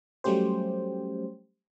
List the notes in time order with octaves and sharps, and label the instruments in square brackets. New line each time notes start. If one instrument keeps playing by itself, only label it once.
[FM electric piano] F#3 G3 A3 C#4 G4 C5